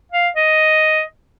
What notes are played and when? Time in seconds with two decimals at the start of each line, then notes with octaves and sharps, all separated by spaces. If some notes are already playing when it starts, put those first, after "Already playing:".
0.12 F5
0.36 D#5